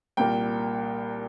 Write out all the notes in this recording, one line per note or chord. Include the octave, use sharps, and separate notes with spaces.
C2 A#2 A#3 G5